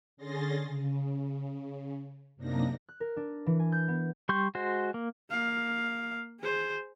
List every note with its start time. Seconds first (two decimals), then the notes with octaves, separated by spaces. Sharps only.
0.17 D3 C#4 G#4 C6 A6 A#6
0.64 C#3
2.36 F#2 C3 A#3 D4 D#4 A#6
2.89 F#6
3.00 A#4
3.17 D4
3.46 E3
3.60 G#5
3.72 G6
3.88 B3
4.29 G3 C6 C#6 G6
4.55 G#3 F#4 C5
4.94 A#3
5.31 A#3 F5
6.40 G#4 C5